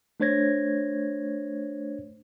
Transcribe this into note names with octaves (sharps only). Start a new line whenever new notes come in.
A3 D4 C5 C#5 G#6 A#6